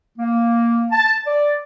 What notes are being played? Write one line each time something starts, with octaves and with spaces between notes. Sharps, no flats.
A#3
A5
D5